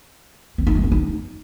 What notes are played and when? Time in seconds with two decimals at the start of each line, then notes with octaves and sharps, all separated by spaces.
0.58 C4
0.67 D#4
0.75 G#3
0.83 B3
0.92 D#4